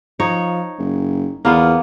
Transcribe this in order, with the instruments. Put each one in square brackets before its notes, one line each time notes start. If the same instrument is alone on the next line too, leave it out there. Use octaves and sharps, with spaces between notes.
[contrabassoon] F3 [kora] D#4 C#5
[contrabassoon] F#1
[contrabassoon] E2 [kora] A#3 B3 F4